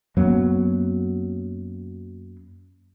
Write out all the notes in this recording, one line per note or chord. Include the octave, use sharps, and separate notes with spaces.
F#2 F#3 A#3 B3